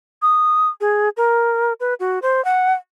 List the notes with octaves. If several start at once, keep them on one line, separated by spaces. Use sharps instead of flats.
D#6
G#4
A#4
B4
F#4
C5
F#5